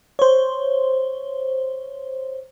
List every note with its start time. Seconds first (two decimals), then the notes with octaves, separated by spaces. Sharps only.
0.19 C5 C#5